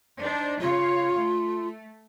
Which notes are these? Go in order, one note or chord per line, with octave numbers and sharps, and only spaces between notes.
D4 D#4 C5
C#3 F4 C#5 F5
A3